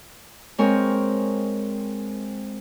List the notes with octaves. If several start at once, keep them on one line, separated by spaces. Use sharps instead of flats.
G#3 C4 A#4 C#5